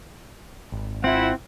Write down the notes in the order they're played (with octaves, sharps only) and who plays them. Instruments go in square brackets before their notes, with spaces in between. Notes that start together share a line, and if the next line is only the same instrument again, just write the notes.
[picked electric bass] G#1
[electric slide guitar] C4 [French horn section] E4 F4 [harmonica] F#5